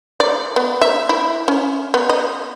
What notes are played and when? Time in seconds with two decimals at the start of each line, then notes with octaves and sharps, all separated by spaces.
0.20 D5
0.56 B3
0.81 E5
1.09 E4
1.48 C#4
1.94 B3
2.09 D#5